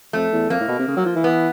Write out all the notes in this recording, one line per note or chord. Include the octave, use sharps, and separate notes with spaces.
F2 A3
E2
F2 A#3
A2
B2
C3
C#3
F#3
F3
E3
B3